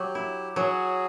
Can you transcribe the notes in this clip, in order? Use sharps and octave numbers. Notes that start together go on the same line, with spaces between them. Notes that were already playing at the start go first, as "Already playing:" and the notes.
Already playing: F#3 G4
E4
F#3 F#4 G#4